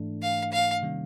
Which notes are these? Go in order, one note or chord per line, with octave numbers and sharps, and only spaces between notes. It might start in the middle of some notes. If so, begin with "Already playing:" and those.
Already playing: G#2 E3 A3 D4
F5
F5
C3 D#3 G3 A#3 C#4